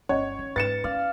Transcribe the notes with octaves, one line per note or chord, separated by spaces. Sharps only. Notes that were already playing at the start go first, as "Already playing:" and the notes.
G1 C#4 C#5 D#5
D#3
G#2 B4 A6 C#7 E7
C#4 D5 F5